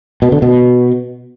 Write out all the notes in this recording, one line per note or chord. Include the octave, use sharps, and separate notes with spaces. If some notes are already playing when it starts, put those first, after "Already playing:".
B2
D3
B2